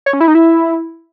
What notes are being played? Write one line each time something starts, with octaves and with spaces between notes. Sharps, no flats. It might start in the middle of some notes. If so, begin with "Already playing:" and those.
C#5
C#4
E4
D#4
E4